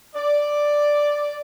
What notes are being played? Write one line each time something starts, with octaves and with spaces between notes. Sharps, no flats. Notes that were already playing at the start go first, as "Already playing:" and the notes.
D5